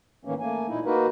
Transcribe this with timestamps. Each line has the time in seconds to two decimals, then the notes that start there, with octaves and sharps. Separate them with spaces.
0.25 A2 D#3 E3 A#3 C#4
0.40 A3 A#3 G#5
0.69 A#2 D#4 E4
0.86 A#3 D#4 F#4 A#4 B4